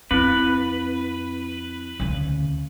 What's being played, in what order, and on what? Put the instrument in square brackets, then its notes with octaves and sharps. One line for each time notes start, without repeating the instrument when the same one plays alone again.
[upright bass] F2 [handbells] C4 E4 [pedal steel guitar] B4
[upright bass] D2 C#3